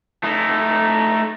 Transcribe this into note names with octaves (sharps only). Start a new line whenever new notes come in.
A3 D#4